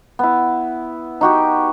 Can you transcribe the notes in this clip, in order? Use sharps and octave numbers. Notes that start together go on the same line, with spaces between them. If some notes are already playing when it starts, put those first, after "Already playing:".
B3 E4
D#4 F#4 G4